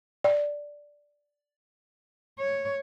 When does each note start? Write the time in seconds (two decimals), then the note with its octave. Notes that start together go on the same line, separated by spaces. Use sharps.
0.24 D5
2.39 C#5